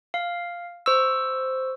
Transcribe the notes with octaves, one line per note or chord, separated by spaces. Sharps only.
F5
C5 C#6 E6